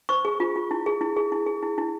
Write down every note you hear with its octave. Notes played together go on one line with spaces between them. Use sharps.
C5 C#6
G#4
F4
F4
E4
G#4
E4
G#4
E4
G#4
E4
E4